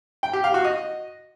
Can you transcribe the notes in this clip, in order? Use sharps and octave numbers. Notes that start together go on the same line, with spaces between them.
G5
G4
F5
F#4
D#5